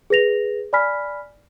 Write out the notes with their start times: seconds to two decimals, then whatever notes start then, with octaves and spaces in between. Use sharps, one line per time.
0.10 G#4 B4 A#6 F7
0.73 D5 G#5 B5 F6 B6